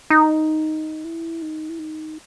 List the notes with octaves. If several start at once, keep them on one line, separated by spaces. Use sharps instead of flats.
D#4
E4
D#4
E4
D#4